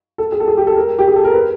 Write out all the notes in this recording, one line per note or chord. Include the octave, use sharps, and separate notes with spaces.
A4
G#4
A4
G#4
G4
A4
A#4
G4
G#4
A4
A#4
B4